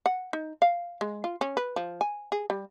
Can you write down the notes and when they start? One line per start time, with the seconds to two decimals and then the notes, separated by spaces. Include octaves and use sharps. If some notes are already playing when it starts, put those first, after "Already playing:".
0.06 F#5
0.33 D#4
0.62 F5
1.01 G#3
1.24 F4
1.41 C#4
1.57 B4
1.76 F3
2.01 G#5
2.32 G#4
2.50 G3